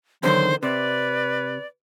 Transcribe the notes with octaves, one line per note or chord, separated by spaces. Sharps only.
E2 D3 D#3 F#3 C5
C3 B4 D5